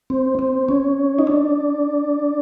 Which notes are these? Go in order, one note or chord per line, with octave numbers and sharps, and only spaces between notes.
C4
C4
C#4
D#4
D4